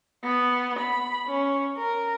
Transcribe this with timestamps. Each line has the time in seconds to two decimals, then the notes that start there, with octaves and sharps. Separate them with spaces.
0.24 B3
0.79 B5
1.29 C#4
1.77 A#4